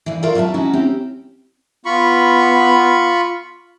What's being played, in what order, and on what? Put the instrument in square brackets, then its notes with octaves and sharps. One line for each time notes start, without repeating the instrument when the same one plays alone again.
[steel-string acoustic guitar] G2 E3
F4 A#4 C#5 D5 E5
F#3 G3 B3 E5 A5
C#4 D#4 E4 F#4
C4 C#4 G4
[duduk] B3 [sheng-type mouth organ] F4 B5 C#6